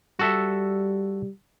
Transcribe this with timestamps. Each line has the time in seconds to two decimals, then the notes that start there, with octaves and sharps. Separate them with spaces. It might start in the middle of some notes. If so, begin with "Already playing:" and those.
0.19 G3 F#4 A4 E5